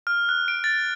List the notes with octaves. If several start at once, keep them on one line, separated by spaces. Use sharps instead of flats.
F6
F#6
D7
A6